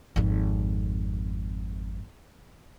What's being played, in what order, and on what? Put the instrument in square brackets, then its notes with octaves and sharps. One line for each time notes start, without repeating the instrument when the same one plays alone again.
[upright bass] G#1 F2